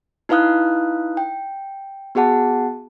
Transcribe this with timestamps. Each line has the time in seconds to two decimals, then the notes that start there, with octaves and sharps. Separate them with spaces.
0.29 D#4 E4 B4 F5 D#6 F#6
1.17 G5
2.15 B3 F#4 G#4 F#5 A5